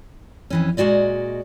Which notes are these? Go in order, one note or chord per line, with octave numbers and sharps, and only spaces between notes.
F2 E3 C#4
A#2 G#3 F#4 D5 D#5